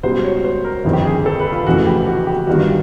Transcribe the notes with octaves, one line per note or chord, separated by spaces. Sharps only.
C#2 B2 G3 C5
C#5
C5
A#4
G1 F2 C3 D#3 G3
G4
G#4
A4
B4
F4
F1 F2 C#3 E3 A3 F#4
G4
F#4
G4
G1 G2 D#3 G3 F#4
F4